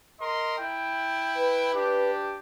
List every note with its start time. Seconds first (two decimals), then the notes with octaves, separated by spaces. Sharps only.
0.20 A#4 D#5 C6
0.58 E4 G5
1.35 B4
1.73 D4 G4